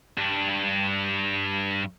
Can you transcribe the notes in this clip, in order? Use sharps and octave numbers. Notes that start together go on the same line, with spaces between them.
G2 D4